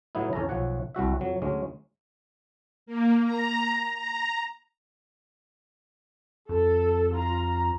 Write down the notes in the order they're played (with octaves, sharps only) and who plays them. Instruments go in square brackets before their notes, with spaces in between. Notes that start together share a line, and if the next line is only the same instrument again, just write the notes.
[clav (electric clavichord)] A2 F#3 B3 D#4 E4
E2 C#4 A4 A#5
B1 F3 C#5 F#5
C2 G3 F#4 E5
F2 F#3
D2 F#3 G#3 C#4
[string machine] A#3
A#5
A#5
[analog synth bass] F2 [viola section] A4
[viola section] F4 A#5